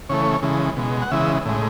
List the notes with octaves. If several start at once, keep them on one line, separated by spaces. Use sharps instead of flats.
C#3 E3 A3 C#5
C#3 E3 G#3
B2 G#3
F#5
C#3 E3 G#3 E5
A2 G#3